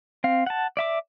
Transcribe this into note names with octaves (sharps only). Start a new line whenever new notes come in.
C4 F5
F#5 A5
D5 E5 D6